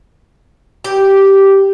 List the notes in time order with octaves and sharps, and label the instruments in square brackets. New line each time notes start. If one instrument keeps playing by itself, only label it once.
[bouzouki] G4